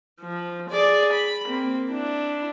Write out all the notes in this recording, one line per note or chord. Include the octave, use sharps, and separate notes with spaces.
F3
G#4 D5
B5
A#3 C4
D4 E4